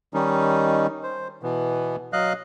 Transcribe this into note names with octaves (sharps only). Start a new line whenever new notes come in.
D#3 G3 C#4 D#4
C5
B2 E3 B3
F#3 D#5 F5 F#6